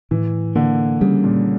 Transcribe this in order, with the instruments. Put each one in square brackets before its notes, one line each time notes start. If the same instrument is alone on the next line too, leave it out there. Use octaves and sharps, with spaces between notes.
[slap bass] A2 [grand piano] E3
[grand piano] D3 [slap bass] A#3
[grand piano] C#3 [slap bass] G3
[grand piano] A#2